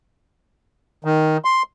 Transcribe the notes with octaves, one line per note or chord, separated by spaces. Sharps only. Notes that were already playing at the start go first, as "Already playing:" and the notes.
D#3
C6